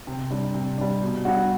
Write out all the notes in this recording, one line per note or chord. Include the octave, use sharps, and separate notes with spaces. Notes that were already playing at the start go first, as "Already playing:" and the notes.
C3
G3 D4
C3
G3 D4
B2
G3 D4 F#4